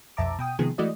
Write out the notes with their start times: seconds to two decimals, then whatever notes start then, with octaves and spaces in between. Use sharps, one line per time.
0.17 B1 F2 E5 A5 A#5 D6
0.39 B2 G5 D#6
0.59 C3 D#3 F3 G#3 B3 G#4
0.78 E3 G#3 A3 F#4 D5 D#5